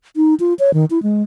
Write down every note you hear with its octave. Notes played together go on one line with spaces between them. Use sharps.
D#4
F4
C#5
D#3
E4
G#3